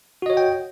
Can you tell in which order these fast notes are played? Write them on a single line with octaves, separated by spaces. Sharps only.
F#4 D#5 C#5 F#5 G5